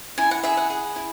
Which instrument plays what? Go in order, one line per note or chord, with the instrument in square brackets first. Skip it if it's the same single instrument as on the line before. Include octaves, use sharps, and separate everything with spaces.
[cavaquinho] E4 G#5
F#5
G#4 E5
F#5
G#4
E4